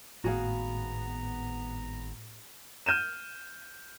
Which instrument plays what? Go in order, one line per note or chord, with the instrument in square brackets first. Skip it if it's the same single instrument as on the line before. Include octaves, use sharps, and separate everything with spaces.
[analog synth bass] G#1 [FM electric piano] A2 [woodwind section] B3 A#5 [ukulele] F#4 G#4 F5
[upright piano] F6 G6 D#7 E7